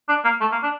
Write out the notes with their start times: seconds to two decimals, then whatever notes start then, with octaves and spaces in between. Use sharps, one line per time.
0.08 D4
0.24 A#3
0.41 A3
0.52 A#3
0.63 D4